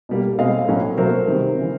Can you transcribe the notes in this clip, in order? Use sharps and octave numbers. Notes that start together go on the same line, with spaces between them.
B2 G3 A#3
B2 G#3 C4 D#5 F5
A2 F#3 A#3 C#4
B2 F#3 A3 A#4 C5
C3 D#3 G3
C#3 E3